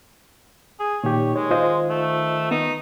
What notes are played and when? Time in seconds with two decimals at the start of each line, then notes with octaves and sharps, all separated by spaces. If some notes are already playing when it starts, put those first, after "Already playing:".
0.80 G#4
1.04 A#2 D#3 G4 C#5
1.36 G#3 C#5
1.51 F4 C5 D#5
1.89 A3
2.51 B3 D#4